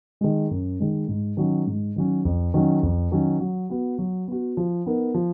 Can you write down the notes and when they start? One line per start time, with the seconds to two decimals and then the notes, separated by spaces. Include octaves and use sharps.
0.21 D#3 G#3
0.51 F#2
0.80 D#3 G#3
1.08 G#2
1.37 D#3 F#3 C#4
1.67 G#2
1.96 D#3 F#3 C#4
2.25 F2
2.54 D#3 F#3 C#4
2.83 F2
3.12 D#3 F#3 C#4
3.40 F#3
3.70 B3 F#4
3.98 F#3
4.28 B3 F#4
4.57 F3
4.86 B3 D#4 A#4
5.14 F3